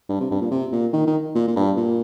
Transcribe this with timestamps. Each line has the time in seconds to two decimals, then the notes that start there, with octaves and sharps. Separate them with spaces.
0.09 G2
0.20 C3
0.31 G2
0.41 A#2
0.51 C3
0.72 A#2
0.93 D#3
1.07 D#3
1.35 A#2
1.47 A#2
1.56 G2
1.77 A#2